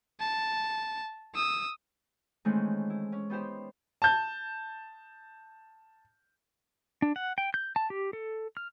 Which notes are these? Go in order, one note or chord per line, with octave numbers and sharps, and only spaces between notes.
A5
D#6 E6
D#3 E3 G#3 A3 C4 C#4
E4
C#4
B3 D#4 G4 C5 G5
A5 G6
D4
F#5
G5
G6
A5
G4
A4
F6